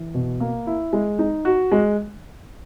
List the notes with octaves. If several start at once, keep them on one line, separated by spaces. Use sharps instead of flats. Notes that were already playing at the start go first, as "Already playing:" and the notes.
Already playing: E3
B2
A#3
E4
G#3
D#4
F#4
G#3